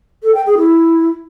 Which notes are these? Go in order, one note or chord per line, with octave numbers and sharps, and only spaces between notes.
A4
G5
G#4
E4